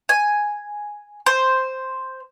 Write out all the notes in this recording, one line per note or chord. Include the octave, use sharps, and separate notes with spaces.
G#5
C5